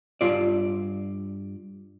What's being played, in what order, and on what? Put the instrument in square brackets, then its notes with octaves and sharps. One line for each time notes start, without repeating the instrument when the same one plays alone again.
[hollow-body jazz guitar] G2 F4 D5